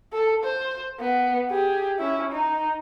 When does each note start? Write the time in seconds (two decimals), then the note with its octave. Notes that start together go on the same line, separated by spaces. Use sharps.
0.13 A4
0.44 C5
1.00 B3
1.51 G4 G#4
1.99 C#4 E4
2.32 D#4